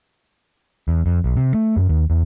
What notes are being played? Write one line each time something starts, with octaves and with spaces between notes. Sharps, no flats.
E2
F2
B1
C3
A3
F#2
D#2
E2